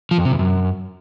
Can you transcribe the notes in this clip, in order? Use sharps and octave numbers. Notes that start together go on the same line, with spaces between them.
F3
F2
C3
E2
F#2